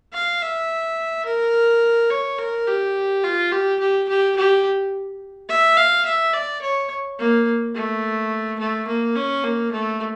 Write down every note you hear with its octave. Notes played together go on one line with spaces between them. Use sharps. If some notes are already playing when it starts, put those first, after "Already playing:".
F5
E5
A#4
C#5
A#4
G4
F4
G4
G4
G4
G4
E5
F5
E5
D5
C#5
A#3
A3
A3
A#3
C#4
A#3
A3